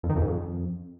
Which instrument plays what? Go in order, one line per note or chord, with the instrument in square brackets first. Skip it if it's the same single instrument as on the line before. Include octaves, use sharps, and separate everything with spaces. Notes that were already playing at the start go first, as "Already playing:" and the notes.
[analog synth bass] F2
D#3
F2
G#2
F2